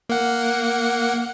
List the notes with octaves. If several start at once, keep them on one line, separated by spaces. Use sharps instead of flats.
A#3 F#5